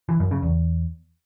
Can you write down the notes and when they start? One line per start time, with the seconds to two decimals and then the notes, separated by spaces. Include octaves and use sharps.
0.09 E3
0.20 F#2
0.31 C#3
0.42 E2